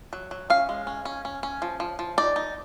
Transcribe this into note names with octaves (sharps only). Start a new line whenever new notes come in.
F#3
F#3
C#4 F5
G#3
C#4
C#4
C#4
C#4
F3
F3
F3
D#4 D5
D#4